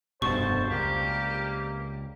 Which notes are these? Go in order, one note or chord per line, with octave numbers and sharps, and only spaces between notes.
F1 G2 B2 F#4 A4 C5 A5 C#6
C#2 C3 G3 A#3 G4